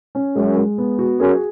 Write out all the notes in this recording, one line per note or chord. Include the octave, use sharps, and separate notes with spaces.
C#4
F#2 G#3
G#3
B3
F#4
F#2 G#4